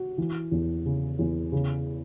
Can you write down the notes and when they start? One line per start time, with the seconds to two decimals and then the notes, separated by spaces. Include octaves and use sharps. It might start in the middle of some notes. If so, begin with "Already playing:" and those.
Already playing: F#4
0.18 E3
0.51 E2
0.86 C#3
1.19 E2
1.52 C#3